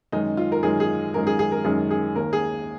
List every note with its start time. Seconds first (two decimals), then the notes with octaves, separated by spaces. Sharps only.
0.12 F#2 D#3 G#3 D#4
0.37 F4
0.52 A#4
0.63 F#2 D#3 G#3 G#4
0.80 G#4
1.14 F#2 D#3 G#3 A#4
1.27 G#4
1.39 G#4
1.52 A#4
1.64 F#2 D#3 G#3 G#4
1.90 G#4
2.15 D#2 D#3 A#3 A#4
2.33 G#4